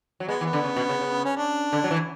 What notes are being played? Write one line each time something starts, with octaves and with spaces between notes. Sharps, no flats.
F#3
G#3 B3
E3
B3
D3
C#3
B2
C#3
C#3
C#4
D4
D3
F#3
E3